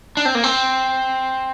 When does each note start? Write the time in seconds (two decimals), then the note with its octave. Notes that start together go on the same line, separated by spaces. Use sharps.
0.17 D4
0.25 C4
0.35 A#3
0.44 C4